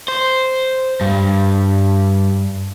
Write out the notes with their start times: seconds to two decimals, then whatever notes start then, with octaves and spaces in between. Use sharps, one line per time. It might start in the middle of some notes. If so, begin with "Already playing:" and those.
0.08 C5
1.01 G2